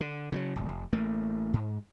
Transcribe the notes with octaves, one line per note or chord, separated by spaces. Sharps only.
D3
C#3 F3 F#3
D1 G1
F1
A1 A3 A#3
G#2